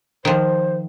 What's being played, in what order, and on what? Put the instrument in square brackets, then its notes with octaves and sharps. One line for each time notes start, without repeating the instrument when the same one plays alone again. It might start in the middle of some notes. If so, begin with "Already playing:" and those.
[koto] D#3 F3 [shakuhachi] C5